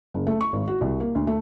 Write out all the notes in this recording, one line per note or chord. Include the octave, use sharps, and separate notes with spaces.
F#1
A3
C#6
G#1
F#4
C2
A#3
D2
A3